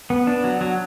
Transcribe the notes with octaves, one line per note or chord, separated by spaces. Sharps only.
B3
D4
F#3
F#3